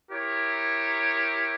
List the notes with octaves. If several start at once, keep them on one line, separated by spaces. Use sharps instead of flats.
E4 G4 A#4 C#5